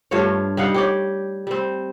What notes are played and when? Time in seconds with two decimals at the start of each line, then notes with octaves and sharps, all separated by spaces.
0.11 G2 A3 F4 C#5
0.57 G3 D#4 F5 F#5
0.74 G4 C#5 D5
1.47 G3 C4